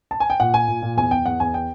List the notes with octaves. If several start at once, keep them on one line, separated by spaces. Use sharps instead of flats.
A5
G#5
G5
A#2 F#5
A#2 G#5
A#2
A#2
E2 G#5
E2 G5
E2 F#5
E2 G#5
G5